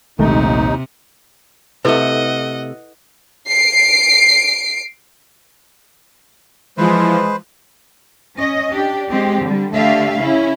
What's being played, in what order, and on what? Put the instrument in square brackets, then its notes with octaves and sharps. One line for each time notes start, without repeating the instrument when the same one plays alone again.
[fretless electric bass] A#1 G#3 [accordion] D#2 D#4 [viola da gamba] C3 [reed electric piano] D#3 A3
[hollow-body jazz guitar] C3 A3 [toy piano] E4 A4 B4 [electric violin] D#5 F#5
[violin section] C7 D7
[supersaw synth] E3 F3 [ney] G#3 [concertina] B4 C5
[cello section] C#4 D#5
D4 G4
G#3 C4 G4
D3 G3
D3 A3 G4 E5 F5
C#3 C#4 E4